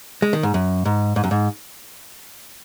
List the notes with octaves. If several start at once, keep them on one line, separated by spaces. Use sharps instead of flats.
G#3
D#3
G#2
F#2
G#2
G#2
F#2
G#2